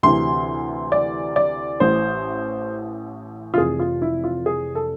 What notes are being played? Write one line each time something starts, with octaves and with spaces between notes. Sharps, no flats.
D2 C3 E3 C6
D5
D5
A1 A2 E3 C5
F4
F1 F2 C3 E3 G#4
F4
E4
F4
G#4
A4